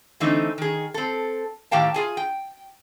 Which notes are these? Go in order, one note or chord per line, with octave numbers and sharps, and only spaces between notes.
D3 E3 A3 C4 D#4
D#3 G#4
C4 A4
A2 D#3 G4 F5 G5 A5
F4 G#4 G#5
G5